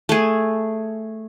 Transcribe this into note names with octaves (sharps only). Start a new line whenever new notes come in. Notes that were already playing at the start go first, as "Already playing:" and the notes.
A3 G#4